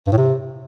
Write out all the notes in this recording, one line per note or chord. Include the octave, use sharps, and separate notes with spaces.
G2
A2
C3